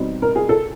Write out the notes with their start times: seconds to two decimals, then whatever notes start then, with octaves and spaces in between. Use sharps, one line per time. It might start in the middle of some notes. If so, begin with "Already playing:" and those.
Already playing: B2 G3 C4 D#4
0.22 A#4
0.36 G#4
0.49 A4